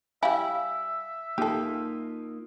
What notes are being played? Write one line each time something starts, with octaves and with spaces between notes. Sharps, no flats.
G3 E4 E5 F5 G#5
A#3 D#4 F4 G4 A4